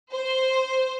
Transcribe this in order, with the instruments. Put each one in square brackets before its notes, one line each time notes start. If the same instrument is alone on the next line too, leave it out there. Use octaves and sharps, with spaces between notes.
[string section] C5